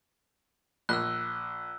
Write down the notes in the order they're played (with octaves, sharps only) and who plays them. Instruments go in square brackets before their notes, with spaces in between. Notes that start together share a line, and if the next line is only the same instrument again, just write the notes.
[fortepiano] A#1 [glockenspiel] E6 F#6